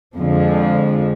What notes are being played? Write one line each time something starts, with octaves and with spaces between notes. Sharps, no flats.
F2 D3 F3 G#3